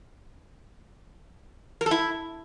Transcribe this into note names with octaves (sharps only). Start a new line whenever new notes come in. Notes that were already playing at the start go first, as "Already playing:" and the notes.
A#4
A4
E4